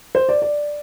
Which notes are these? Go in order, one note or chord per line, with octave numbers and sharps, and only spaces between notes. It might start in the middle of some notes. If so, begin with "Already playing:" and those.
C5
D5
D5